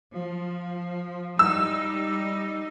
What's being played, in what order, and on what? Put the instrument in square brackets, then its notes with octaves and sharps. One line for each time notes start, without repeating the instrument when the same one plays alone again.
[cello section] F3
[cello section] G3 D#4 [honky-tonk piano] E6